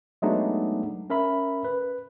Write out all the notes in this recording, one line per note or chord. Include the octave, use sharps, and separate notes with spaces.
F#3 G#3 A3 B3 D4 D#4
C#4 A#4 E5 B5
B4